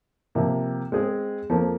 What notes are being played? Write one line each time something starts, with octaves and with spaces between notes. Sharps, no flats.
C3 F3 A#3
G#3 C4 G#4
F2 F3 A#3